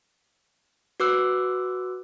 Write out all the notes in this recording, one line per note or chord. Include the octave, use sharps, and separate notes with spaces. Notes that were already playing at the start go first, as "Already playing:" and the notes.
F#4 B4 D6 E6 F#6